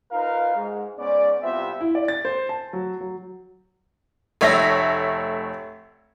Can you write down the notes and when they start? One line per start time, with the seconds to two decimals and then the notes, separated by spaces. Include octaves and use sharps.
0.11 D#4 F4 A#4 B4 F5
0.55 G#2
0.97 G#2 B3 C#4 D5
1.43 C2 B3 C4 F4 E5
1.81 E4
1.95 D5
2.08 A6
2.25 C5
2.49 A5
2.73 F#3
3.01 F#3
4.41 F1 A3 C#5 E5 E6 A#6